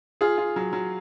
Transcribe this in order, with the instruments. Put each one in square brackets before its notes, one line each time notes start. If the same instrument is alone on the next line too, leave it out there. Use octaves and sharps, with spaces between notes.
[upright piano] F4 [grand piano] G#4
[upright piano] F4
F#3
F#3